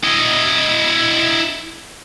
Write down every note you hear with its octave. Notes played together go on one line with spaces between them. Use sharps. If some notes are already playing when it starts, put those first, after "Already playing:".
E4 D#5